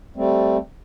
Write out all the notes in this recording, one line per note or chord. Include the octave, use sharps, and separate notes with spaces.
G3 A3 C4